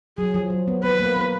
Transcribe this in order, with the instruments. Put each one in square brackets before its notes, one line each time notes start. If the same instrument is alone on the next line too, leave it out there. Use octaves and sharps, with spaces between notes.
[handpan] F#3 [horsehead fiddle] G#4
[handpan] F3
F#3
B3
[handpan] B3 [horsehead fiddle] B4
[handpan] A#3
B3